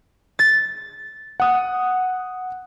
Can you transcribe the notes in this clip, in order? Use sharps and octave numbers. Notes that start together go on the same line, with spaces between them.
A6
F#5 D#6 F#6